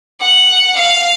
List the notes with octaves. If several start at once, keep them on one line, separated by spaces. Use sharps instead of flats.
F#5
F5